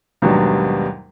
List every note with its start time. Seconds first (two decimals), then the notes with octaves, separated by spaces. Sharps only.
0.22 D#2 G#2 B2 F#3 G3 D4